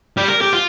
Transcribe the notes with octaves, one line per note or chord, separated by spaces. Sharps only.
G3
A#4
G4
F4